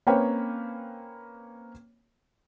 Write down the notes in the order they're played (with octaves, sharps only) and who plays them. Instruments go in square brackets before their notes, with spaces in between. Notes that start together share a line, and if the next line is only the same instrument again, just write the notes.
[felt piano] A#3 C4 C#4 B4 C#5 G5